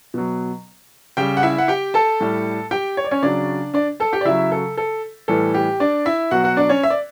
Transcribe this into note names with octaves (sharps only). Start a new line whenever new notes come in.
B2 F#3
C#3 G3 G4 G5
F#5
E4 E5
F#5
G4 G5
A4 A5
A2 G3
G4 G5
C#5
D5
C#4 C#5
C#3 F#3 D4 D5
D4 D5
A4 A5
G4 G5
D5
C#3 F#3 E4 E5
A4
A4
A2 E3 G3 A4
G4
D4 D5
E4 E5
B2 F#3 F#4 F#5
F#4 F#5
D4 D5
C#4 C#5
E5
D5